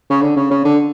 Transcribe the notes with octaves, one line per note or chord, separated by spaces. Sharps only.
C#3
D3
C#3
C#3
D3